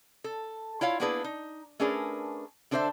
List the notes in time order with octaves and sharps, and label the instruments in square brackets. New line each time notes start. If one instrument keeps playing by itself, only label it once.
[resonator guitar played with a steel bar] A4
E4 F4 C#5 F5
A#3 B3 D4 E4 G#4 B4
D#4
A3 C#4 D4 G#4 A#4 B4
D3 D4 A4 C5 D#5 E5